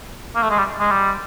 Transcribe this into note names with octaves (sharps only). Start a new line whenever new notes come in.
A#3
A3
G#3
G3
G#3
G3